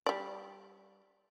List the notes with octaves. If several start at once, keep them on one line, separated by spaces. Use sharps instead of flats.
G3 D5